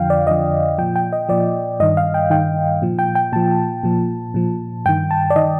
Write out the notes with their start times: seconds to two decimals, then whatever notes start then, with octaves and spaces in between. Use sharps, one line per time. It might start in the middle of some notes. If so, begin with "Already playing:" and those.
Already playing: F2 D3 F3 F5 G5
0.10 D5
0.27 F2 D3 F3 D#5
0.78 A#2 F3 G5
0.96 G5
1.13 D#5
1.29 A#2 F3 D5
1.80 G2 D#3 D#5
1.97 F5
2.14 G5
2.30 G2 D#3 G5
2.82 A#2 F3
2.99 G5
3.15 G5
3.32 A#2 F3 A5
3.83 A#2 F3
4.34 A#2 F3
4.85 G2 D#3 G5
5.11 A5
5.30 D5
5.36 D#3 D#5